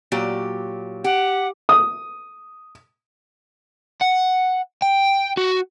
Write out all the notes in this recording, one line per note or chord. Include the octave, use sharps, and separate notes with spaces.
A#2 F#3 G4
G4 F#5
D#6
F#5
G5
F#4